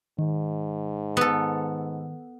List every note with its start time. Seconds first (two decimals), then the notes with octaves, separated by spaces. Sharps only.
0.19 G#2 D#3
1.17 B3 A4